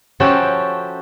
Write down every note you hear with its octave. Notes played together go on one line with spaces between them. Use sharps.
F3 C#4 E4 F#4 G4 A4